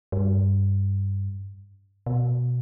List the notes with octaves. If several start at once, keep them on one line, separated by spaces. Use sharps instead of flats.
G2
B2